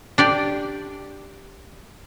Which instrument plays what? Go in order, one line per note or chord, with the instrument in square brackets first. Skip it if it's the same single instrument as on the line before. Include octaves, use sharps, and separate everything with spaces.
[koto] D4 G4 D5